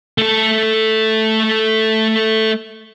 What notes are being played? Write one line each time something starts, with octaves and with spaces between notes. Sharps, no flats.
A3 A4